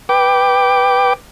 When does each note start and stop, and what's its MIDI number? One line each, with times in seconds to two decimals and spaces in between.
0.09 1.13 71
0.09 1.13 79
0.09 1.13 86